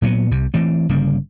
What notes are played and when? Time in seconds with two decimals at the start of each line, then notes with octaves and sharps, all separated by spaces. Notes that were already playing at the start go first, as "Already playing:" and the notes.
0.02 A#2 F#3 G#3 B3
0.31 C2 C3
0.54 E3 A3 C4
0.89 G1 C#3 G3 A#3